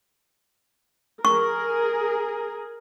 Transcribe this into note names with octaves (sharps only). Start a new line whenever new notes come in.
G#4 A#4 C#6